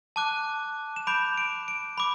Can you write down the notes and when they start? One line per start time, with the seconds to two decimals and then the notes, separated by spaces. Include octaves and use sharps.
0.16 A5 D6 F#6
0.96 E7
1.07 B5 D6 G6 D7
1.38 D7
1.68 D7
1.97 B5 D6